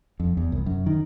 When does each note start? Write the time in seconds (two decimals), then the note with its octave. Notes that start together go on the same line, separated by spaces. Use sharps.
0.20 F2
0.37 E2
0.52 C2
0.66 F#2
0.86 D#3